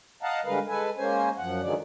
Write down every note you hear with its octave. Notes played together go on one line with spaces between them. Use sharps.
D#5 F5 F#5 A5 A#5
D3 G3 G#3 A#4 B4 F5
G#3 A4 B4 G#5
G#3 A#3 C#4 C5 G#5
F#2 F3 F#5
D3 D#3 F3 F#3 G#3 D5